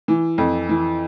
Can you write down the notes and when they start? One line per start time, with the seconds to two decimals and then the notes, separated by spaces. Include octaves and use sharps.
0.08 E3
0.38 F2
0.69 E3